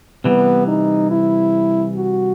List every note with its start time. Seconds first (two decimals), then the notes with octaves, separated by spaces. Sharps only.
0.24 C3 E3 G3 B3
0.68 D#4
1.11 E4
1.96 F#4